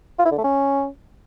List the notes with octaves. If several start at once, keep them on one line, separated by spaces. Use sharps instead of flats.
F4
E4
D3
A3
C#4